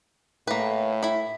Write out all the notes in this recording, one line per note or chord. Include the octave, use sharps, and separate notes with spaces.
A2 A#3 B4
E4 B5